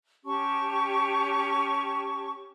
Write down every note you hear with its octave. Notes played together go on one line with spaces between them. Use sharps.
C#4 G4 A5 C#6